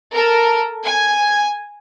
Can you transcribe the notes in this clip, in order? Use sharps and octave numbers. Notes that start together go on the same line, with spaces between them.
A4 A#4
G#5